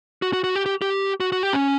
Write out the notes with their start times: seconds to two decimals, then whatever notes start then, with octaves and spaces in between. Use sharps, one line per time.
0.22 F#4
0.33 F#4
0.44 F#4
0.56 G4
0.66 G4
0.82 G4
1.20 F#4
1.32 F#4
1.43 G4
1.53 C#4